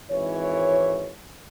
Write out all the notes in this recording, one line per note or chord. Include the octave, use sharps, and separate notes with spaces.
G#1 E3 C#5